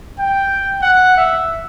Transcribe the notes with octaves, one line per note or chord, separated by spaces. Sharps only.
G5
F#5
E5